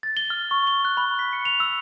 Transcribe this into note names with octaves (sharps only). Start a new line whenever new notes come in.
A6
G7
F6
C#6
G7
F#6
B5
B6
C#7
F7
E6